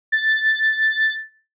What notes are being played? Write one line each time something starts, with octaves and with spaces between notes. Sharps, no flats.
A6